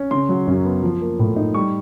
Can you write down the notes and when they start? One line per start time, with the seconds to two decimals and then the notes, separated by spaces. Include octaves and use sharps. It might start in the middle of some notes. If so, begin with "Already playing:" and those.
Already playing: C#4
0.11 C#3 C6
0.29 F#3
0.47 F#2
0.65 B3
0.83 F3
1.01 A#3
1.19 A2
1.36 D#4
1.54 G3 C#6